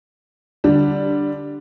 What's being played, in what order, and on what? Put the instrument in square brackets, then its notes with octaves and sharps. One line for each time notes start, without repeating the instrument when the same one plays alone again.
[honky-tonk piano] D3 G3 D4